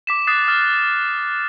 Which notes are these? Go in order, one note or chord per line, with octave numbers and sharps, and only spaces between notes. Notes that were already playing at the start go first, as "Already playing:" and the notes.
D6 B6 E7
D#6 F#6 A6 C7 E7
F6 A6